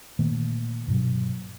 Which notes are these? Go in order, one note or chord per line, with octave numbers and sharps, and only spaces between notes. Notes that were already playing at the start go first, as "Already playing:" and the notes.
A#2 D#3 A3 A#3
G2 B2 F#3